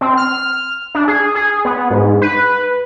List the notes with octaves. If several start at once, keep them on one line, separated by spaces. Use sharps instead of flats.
C4
F6
D4
G#4
G#4
B3
G#2
B4